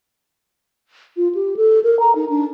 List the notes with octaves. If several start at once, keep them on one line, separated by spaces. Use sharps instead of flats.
F4
G4
A4
A#4
A#5
D#4
D4